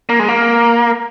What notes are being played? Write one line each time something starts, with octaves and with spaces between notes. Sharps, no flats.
A#3
G#3
A#3